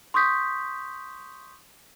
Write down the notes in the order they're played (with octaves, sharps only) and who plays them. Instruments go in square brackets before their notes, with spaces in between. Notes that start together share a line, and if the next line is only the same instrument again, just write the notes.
[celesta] C6 C#6 D#6 G6 B6